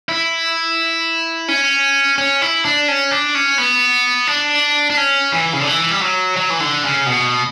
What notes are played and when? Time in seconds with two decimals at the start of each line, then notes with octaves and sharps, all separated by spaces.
0.09 E4
1.48 C#4
2.18 C#4
2.42 E4
2.65 D4
2.88 C#4
3.11 D4
3.35 C#4
3.58 B3
4.27 D4
4.90 D4
4.97 C#4
5.32 E3
5.53 C#3
5.60 D3
5.67 E3
5.91 G3
6.02 F#3
6.37 F#3
6.50 E3
6.60 D3
6.84 C#3
7.06 B2